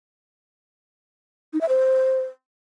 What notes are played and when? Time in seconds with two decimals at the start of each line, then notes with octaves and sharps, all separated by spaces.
1.53 D#4
1.61 E5
1.69 C5